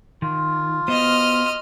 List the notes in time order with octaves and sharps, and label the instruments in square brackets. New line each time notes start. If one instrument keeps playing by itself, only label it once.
[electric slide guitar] D#3 [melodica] F4
[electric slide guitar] B3 F#4 C5 [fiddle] D#5 F6